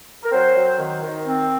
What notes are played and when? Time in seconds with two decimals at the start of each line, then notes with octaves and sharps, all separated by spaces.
0.23 A#4
0.31 F#3 C4 C5
0.55 F#3
0.79 D#3
1.03 D#3
1.27 C4